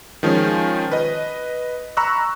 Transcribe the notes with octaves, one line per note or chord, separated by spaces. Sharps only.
D#3 F3 G#3 C#4
B4 D#5
A#5 B5 C#6 E6 F#6